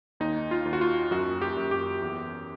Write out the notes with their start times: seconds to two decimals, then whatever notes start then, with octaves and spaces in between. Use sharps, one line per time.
0.20 D#2 D#4
0.51 F4
0.65 D#2
0.73 F#4
0.81 F4
1.11 F#2 F#4
1.42 G4
1.57 F#2
1.71 G4
2.02 E2